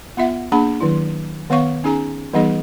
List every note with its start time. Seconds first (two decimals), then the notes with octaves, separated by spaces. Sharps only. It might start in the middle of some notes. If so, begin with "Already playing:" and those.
0.17 B3 F4 E5 F#5
0.52 A#3 D4 G#4 B5
0.81 D#3 F#3 E4
1.50 D#3 B3 C#5 F5 C#6
1.84 C#4 D#4 G#4 G#5 A#5
2.33 E3 G3 B3 D#4 G#4 D#5